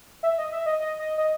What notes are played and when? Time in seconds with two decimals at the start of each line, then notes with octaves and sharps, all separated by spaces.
0.23 E5
0.38 D#5
0.52 E5
0.66 D#5
0.80 D#5
0.99 D#5
1.18 D#5